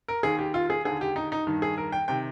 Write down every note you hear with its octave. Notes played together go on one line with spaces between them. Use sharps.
A#4
D#2 D#3 G#4
G4
F4
G#4
D#2 D3 G#4
G4
D#4
D#4
G2 D#3
G#4
A#4
G5
C3 D#3 G5